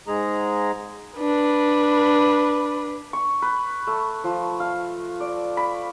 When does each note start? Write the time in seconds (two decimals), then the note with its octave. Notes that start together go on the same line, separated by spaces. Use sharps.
0.07 G#2 G#3 G#4 A#5
1.18 D4 B4
3.13 C#6
3.42 B4
3.87 A3
4.24 F3
4.60 F5
5.20 D5
5.57 B5